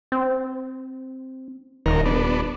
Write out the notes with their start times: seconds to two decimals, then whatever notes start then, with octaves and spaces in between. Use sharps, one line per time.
0.12 C4
1.86 D#1 D#2 D#3 A#4
2.05 B3 D4